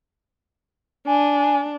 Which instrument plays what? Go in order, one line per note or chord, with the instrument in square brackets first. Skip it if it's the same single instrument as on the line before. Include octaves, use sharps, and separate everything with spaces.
[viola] D4 [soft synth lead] G#5